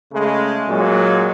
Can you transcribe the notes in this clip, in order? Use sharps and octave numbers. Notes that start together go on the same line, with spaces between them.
C#3 G#3 A3
A#2 F#3 G#3